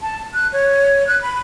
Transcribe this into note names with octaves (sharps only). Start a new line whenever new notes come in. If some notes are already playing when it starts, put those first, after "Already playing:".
A5
F#6
C#5
F#6
B5